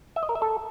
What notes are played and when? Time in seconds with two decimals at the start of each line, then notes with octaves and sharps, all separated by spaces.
0.16 E5
0.23 D#5
0.29 A#4
0.35 E5
0.42 A4